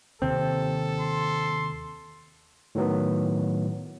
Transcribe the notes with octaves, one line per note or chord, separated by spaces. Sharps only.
D#2 C3 C4 A4
C6
A2 D#3 F#3 B3